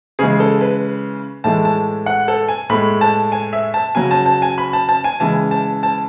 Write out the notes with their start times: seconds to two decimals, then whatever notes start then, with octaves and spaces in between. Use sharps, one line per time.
0.19 C#3 E3 G#3 G#4
0.40 A4
0.61 B4
1.44 A2 E3 G#3 A5
1.65 A5
2.06 F#5
2.28 A4
2.49 G#5
2.70 A2 G#3 B5
3.01 A5
3.32 G#5
3.53 E5
3.74 A5
3.95 C#3 F#3 G#5
4.11 A5
4.26 A5
4.42 G#5
4.58 B5
4.73 A5
4.89 A5
5.04 G#5
5.20 C#3 E3 G#3 A5
5.51 A5
5.83 A5